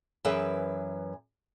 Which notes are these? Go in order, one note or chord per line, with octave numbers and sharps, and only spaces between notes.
F#2 E3 G#4 B4 E5